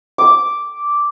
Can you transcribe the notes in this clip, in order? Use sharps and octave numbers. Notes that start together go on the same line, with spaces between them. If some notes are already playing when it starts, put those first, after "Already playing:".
D6